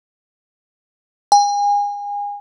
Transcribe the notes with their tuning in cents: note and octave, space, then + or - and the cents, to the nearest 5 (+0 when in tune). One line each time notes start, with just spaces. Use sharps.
G#5 -30